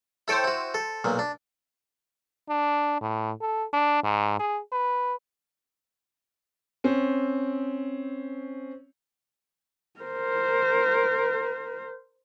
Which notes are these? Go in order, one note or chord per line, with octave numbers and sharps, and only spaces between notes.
E4 A4 C5 C#5 G5 E6
E4 F#4
A4
B1 A#2 F#3
D4
D4
A2
A4
D4
G#2
G#4
B4
C4 C#4
A#4 C5